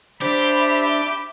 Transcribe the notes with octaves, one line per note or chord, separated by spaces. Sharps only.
D4 G4 C5 E5 B5